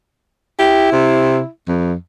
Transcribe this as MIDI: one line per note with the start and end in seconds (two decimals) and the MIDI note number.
0.59 1.49 64
0.59 0.90 67
0.92 1.41 48
1.68 1.94 41